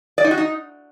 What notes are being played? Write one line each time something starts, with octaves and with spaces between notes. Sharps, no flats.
D5
D#4
F#4
D#4